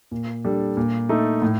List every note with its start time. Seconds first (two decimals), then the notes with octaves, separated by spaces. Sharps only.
0.11 A#2
0.44 G3 D4 A4
0.77 A#2
1.09 A3 D#4 A4
1.42 A2